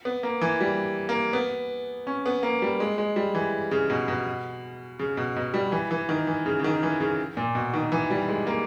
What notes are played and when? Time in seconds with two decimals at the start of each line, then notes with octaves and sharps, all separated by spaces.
0.05 B3
0.23 A#3
0.41 E3
0.61 G3
1.09 A#3
1.33 B3
2.07 C#4
2.26 B3
2.43 A#3
2.62 G3
2.80 G#3
2.98 G#3
3.16 G3
3.35 E3
3.71 C#3
3.90 B2
4.08 B2
4.99 C#3
5.17 B2
5.36 B2
5.54 G3
5.72 E3
5.91 E3
6.09 D#3
6.27 E3
6.46 C#3
6.59 C#3
6.64 D#3
6.83 E3
7.00 C#3
7.37 A#2
7.55 B2
7.74 D#3
7.92 E3
8.10 G3
8.29 G#3
8.47 A#3